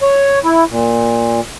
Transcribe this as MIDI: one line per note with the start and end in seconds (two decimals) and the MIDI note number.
0.01 0.39 73
0.44 0.64 64
0.70 1.41 46